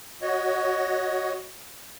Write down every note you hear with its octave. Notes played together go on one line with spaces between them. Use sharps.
F#4 C#5 D#5